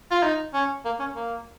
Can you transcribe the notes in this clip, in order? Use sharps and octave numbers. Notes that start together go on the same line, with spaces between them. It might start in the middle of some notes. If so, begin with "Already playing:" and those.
F4
D#4
C#4
A#3
C#4
A#3